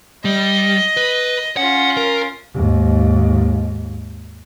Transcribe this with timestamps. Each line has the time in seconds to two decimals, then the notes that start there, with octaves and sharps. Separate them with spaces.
0.25 G3 D#5
0.97 B4
1.57 C#4 F4 F#5
1.97 A#4
2.54 D#2 G#2